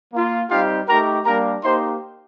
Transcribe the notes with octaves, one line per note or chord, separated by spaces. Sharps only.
A#3 F4
G3 C4 D#4 F4 G4 F5
A3 D#4 G4 A#4 A#5
G3 A#3 D4 G4 A#4 A#5
A#3 D#4 G4 C5 C6